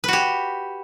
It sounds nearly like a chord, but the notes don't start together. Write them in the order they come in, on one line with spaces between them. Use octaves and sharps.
B4 F#4 G4